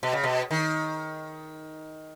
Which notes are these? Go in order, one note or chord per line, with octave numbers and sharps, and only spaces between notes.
B2
C#3
B2
D#3